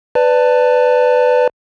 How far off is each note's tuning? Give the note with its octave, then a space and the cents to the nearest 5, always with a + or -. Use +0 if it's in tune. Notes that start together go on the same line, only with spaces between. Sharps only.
B4 +15 D5 +0 A5 +20